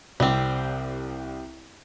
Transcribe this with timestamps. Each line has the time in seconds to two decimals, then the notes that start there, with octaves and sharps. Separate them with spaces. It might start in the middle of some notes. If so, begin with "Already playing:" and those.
0.20 C2 G3 C4